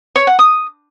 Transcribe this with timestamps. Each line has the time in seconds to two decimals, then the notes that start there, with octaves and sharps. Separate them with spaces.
0.16 C#5
0.27 F#5
0.39 D#6